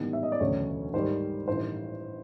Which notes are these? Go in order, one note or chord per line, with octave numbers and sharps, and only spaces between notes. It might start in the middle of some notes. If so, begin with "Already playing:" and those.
Already playing: A1 G#2 D#3 G3 B3
E5
D#5
D5
E1 D2 C#3 F#3 A3 C#5
G#1 G#2 D#3 G3 C5
A1 G2 D#3 G3 C5